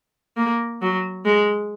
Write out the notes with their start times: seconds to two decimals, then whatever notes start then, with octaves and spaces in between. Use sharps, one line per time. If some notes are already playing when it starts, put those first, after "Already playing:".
0.37 A#3
0.82 F#3
1.25 G#3